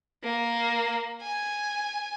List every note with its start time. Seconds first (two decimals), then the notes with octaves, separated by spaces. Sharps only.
0.23 A#3
1.22 G#5